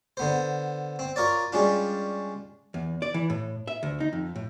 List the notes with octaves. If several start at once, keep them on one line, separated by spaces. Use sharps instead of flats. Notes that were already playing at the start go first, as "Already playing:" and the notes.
D3 B3 C5
C4
F4 A#4 C#5 D5
G3 G#3 C#4 D4 F4
E2
D5
E3
A2
E5
D2
D#4
F2
A2